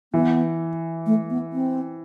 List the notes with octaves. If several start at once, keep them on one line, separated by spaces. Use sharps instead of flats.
E3 B3
A3
B3
C4